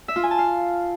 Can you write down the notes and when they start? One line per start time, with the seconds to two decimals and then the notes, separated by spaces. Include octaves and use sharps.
0.08 E5
0.16 F4
0.23 G#5
0.31 A5
0.38 F5